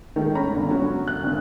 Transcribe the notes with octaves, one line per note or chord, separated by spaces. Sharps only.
D#3 G#3 A3
C#4 A#5 B5
G1 D3
F#3 C#4 F#4
F#6
G#1 D3